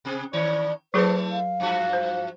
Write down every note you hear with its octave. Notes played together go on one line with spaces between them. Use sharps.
C3 C4 G#4
A2 D#3 C#5 D5
F#3 A3 E4 G#4 A4 B4 C5
F5
G2 F3 F#4
C5